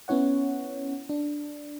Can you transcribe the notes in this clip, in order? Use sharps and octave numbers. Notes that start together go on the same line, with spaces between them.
B3 C#4 E4 C#5 F#5
D4